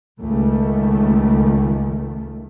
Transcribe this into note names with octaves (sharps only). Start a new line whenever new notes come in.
C#2 D#3 A3